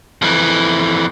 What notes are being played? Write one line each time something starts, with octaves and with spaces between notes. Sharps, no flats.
F2 E3